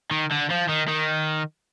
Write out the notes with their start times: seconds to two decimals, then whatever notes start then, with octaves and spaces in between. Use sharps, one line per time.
0.11 D#3
0.31 D3
0.50 F3
0.69 D#3
0.88 D#3